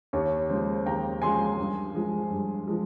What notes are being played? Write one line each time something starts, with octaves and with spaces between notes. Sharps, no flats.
D#2 C#5
C#3 F3 G#3 C5
D#2 G5 A#5
C#3 F3 G#3 G#5 C6
G2
F3 G#3
G2
F3 G#3